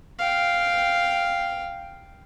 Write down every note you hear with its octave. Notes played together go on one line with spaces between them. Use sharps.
F5 G5